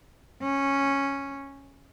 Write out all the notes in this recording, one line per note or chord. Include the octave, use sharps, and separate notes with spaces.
C#4